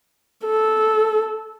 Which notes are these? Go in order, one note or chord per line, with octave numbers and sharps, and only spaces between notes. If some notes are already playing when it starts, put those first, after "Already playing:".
A4